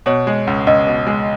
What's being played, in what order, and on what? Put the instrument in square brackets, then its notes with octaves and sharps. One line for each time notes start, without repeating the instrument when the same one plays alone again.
[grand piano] B2 [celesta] C#5
[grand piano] G#3
C#2
[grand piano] C#2 [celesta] D#5
[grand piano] B2
G#3